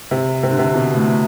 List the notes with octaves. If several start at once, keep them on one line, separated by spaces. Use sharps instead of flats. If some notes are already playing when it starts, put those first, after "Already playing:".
C3
C3
D3
C3
B2
A2